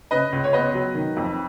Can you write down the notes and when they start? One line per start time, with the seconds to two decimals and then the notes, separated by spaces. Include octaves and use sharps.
0.11 C#3 B4 D#5
0.32 C#2
0.44 C#5
0.53 B3 B4 D#5
0.74 F#3
0.95 D#3
1.17 F2